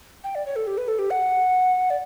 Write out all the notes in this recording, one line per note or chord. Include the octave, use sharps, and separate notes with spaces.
G5
D5
C#5
A4
G4
B4
A4
G4
F#5
D5